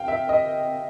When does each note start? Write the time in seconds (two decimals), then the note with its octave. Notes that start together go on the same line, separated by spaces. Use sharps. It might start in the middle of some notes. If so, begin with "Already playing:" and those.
Already playing: F5 G5
0.08 E5
0.29 D#5